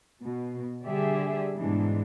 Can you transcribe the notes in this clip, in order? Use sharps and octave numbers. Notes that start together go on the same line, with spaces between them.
B2
D3 G3 G4 G#4 D5 E5
G#2 B2 E3 G#3 D4